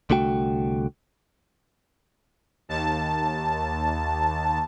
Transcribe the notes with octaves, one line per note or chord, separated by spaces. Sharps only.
C2 D3 A3 F#4 G5
D#2 A5